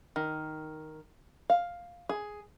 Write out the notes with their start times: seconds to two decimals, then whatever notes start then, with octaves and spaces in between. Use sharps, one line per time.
0.16 D#3
1.50 F5
2.09 G#4